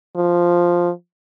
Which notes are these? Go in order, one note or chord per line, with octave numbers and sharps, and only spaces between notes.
F3